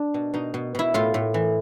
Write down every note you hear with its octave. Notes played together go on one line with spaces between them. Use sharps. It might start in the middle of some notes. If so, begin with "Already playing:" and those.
Already playing: D4
B2
B2 D#4
B2
B2 E4
A2 F4
A2
E3